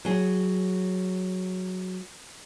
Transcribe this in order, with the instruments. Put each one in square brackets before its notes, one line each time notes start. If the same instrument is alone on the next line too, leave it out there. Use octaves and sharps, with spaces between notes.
[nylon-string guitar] F#3 G#4